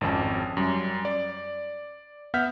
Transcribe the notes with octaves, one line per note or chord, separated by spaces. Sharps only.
G#1 F2 C#4 A5
F#2 G3
D5
B3 E5 F#5 F6 G6 B6